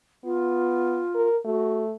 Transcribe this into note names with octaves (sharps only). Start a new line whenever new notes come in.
B3 F4
A#4
A3 F#4